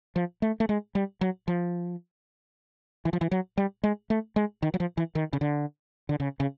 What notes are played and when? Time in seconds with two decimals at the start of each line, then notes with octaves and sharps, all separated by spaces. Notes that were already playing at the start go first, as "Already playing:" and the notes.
0.16 F3
0.42 A3
0.60 A3
0.69 G#3
0.95 G3
1.21 F#3
1.48 F3
3.05 E3
3.13 F3
3.21 E3
3.31 F#3
3.57 G3
3.83 G#3
4.10 A3
4.36 G#3
4.62 D#3
4.74 F#3
4.80 F3
4.97 E3
5.15 D#3
5.33 C#3
5.41 D3
6.09 D3
6.20 C#3
6.40 C#3